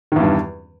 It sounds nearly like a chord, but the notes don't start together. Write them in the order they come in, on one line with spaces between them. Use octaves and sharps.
D#3 E2 G2